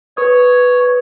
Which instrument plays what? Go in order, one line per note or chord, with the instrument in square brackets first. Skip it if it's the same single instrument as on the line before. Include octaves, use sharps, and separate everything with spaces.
[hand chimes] B4 D#6 [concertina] C#5